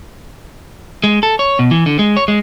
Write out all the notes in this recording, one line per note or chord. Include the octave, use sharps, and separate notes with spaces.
G#3
A4
C#5
B2
E3
D3
G#3
C#5
G#3